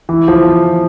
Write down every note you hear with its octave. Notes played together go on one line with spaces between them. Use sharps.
E3
F3